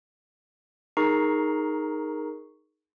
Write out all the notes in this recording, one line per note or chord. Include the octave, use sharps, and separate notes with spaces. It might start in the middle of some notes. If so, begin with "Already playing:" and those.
D#4 G#4 A#4 A#5 C#6 C7